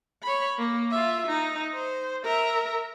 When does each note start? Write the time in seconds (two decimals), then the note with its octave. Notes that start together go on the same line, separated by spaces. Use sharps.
0.23 C#5 B5
0.58 A#3
0.91 F4 E5
1.27 D#4
1.73 C5
2.24 A#4 E5